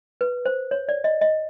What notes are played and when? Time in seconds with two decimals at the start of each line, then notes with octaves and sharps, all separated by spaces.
0.21 B4
0.46 C5
0.71 C#5
0.89 D5
1.04 D#5
1.21 D#5